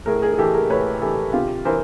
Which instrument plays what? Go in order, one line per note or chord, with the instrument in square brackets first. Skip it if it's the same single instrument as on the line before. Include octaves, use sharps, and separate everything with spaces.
[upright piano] A2 G#4 A#4
G#4 A#4
G#4
E3 G4 A4
G#4 A#4
A2 B4 C#5
E3 G4 A4
C3 F4 G4
E3 A#4 C5